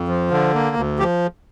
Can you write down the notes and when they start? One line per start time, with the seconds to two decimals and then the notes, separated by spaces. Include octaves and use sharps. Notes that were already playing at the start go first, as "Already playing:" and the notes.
Already playing: F2
0.08 F3
0.31 D3
0.54 A#3
0.76 D2
0.99 F3 G4